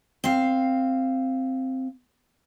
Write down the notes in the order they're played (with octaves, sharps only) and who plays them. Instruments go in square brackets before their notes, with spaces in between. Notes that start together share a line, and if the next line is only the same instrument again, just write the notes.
[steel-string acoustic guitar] C4 F5